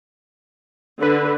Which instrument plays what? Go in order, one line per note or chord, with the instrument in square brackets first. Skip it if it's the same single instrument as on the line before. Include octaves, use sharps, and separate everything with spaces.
[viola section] D3 [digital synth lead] B4